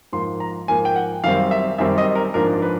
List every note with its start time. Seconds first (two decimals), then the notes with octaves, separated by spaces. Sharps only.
0.12 G#2 F3 A#3 C6
0.40 A#5
0.68 G#2 F3 A#3 G#5
0.85 G5
0.96 F#5
1.24 F#2 D#3 G3 C4 F5
1.51 E5
1.78 F#2 D#3 G3 C4 E5
1.98 D#5
2.15 A#4
2.34 G#2 F3 A#3 D4 A#4
2.62 B4